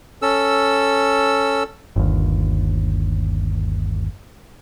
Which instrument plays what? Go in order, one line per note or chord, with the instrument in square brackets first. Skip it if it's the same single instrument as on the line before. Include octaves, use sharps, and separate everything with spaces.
[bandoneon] C#4 A4 E6
[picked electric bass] G1 D#2